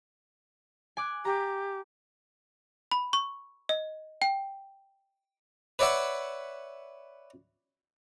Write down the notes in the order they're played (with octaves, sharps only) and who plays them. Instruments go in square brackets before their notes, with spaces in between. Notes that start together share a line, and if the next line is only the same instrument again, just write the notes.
[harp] G#5 D6 F#6
[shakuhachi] G4 [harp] A#5
[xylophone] B5
C#6
D#5
G5
[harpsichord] B4 C#5 D5 E5 F#5